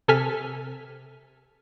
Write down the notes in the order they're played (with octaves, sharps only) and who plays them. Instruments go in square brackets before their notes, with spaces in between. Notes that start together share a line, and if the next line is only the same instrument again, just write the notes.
[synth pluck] C3 A4 G#5 F6 B6